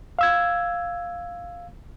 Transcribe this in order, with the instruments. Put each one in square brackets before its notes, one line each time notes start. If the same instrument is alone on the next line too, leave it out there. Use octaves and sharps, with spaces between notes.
[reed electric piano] F5 E6 G#6